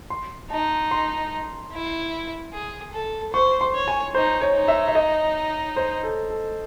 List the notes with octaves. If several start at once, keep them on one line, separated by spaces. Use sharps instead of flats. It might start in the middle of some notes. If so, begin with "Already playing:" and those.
C6
D#4 A5
C6
E4
G#4
A4
C5 C#6
C6
C#5
G#5
D#4 C5
C#5
D#4
E5
E5
D#5
C5
A4
A4